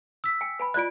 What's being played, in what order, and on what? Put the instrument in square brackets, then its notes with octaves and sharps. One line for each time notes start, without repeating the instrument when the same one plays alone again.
[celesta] E6 B6
[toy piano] G5 G#5
B4 G#5 B5
[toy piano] F4 D5 D#5 [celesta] F#6 D7